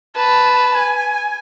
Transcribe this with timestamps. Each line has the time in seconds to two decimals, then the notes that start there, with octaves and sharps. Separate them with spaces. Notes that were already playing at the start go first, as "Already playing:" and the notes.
0.15 B4 A5
0.75 G#5